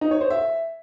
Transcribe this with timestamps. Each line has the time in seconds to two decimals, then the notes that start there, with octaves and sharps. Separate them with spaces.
0.01 D#4
0.11 C#5
0.21 C5
0.30 E5